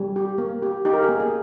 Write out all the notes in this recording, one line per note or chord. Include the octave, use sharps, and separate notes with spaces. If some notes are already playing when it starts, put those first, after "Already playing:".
Already playing: G3
G4
A#3
G4
D#4 G4
A#4
G#4
A#3
G#4